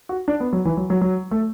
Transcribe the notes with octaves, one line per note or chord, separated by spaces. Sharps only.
F#4
D4
B3
F#3
E3
F#3
F#3
F#3
A3